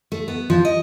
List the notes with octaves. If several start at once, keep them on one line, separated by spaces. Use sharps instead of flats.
A3
B3
F3
D#5